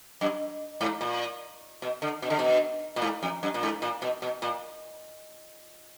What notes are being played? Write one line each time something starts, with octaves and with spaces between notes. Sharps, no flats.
F#2
G#2
A#2
B2
D3
B2
D3
B2
A#2
G#2
F2
F#2
A#2
G#2
A#2
B2
B2
A#2